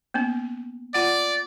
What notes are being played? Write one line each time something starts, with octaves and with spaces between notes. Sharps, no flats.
A#3 B3 C#4
F4 D5 F#5